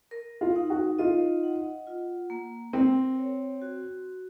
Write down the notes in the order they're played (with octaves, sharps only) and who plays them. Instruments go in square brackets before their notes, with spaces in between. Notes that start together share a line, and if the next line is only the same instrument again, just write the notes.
[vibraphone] A#4
[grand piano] F4
[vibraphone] D#4
[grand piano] F#4
[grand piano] F4 [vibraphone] D#5
[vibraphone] F#5
F4
A#3
[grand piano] C4 [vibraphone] A#4
[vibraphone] C#5
F#4